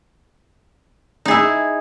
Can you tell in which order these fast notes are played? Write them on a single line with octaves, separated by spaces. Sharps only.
D#4 G#4 E4